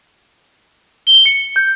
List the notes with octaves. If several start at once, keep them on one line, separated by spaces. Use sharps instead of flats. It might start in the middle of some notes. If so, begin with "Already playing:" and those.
G7
C#7
G6